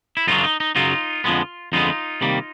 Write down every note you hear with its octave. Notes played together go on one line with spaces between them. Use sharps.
E4
F#2 C#3 F#3 D#4 F4
D4
D#4
D#4
F#2 C#3 F#3 D#4 F4
F2 D3 F3 G#3 B3
F2 D3 F3 G#3 B3 D#4 F4
C3 D#3 G3 A#3